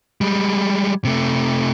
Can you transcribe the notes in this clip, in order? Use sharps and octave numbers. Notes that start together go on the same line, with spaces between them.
G3 G#3
C3 A3